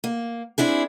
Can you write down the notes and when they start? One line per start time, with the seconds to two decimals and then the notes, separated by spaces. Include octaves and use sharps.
0.04 A#3
0.58 C4 D4 E4 G#4